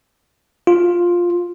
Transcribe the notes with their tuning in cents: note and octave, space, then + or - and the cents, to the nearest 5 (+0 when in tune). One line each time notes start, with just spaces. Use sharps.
F4 +5